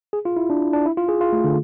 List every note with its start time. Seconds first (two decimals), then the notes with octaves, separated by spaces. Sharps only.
0.13 G#4
0.25 F4
0.37 E4
0.50 D4
0.73 D4
0.86 E4
0.97 F4
1.09 G#4
1.21 F4
1.33 A3
1.44 D3